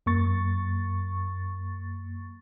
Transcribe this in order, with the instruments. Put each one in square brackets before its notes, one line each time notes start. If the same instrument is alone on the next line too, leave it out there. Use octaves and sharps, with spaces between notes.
[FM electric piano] F#2 A#3 C#6 A6